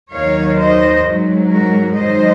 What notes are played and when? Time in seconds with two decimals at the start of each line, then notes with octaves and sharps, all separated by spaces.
0.12 D#2 D#3 F#3 C#5 F5
0.58 C5 D#5
1.04 G#2 F#3
1.49 F#4 A#4
1.95 G#2 D#3 F#3 C5 D#5